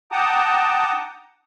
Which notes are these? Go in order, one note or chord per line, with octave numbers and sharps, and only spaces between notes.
F#5 G5 A5 A#5 D6 D#6